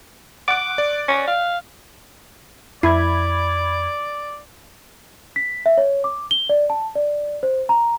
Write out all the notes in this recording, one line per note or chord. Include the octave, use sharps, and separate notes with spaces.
F#5 D6 F#6
D5
C#4
F5
F2 E4 D5 B5 G#6
B6
E5
C#5
D6
G7
D5
A5
D5
C5
A#5